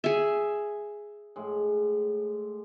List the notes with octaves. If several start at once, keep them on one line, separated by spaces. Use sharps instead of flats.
G#4 E5
A2 G#3